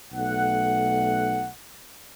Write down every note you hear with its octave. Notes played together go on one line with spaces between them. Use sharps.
B1 A3 F#5